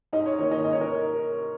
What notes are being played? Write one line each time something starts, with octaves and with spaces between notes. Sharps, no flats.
G#2 D#4 D#5
C#5
D#3 A#3 C#5
D#4 D#5
G#2 D#5
C#5
A#4